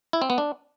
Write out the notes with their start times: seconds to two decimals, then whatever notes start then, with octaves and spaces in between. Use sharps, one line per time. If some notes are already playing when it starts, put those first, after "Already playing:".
0.13 E4
0.22 C4
0.30 B3
0.38 D4